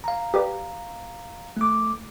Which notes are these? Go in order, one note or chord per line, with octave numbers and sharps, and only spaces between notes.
F5 A#5
G4 B4 D5
A3 D6